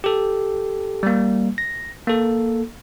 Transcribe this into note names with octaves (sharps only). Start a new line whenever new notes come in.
G4 A4
G3 A#3
A#6
A#3 A4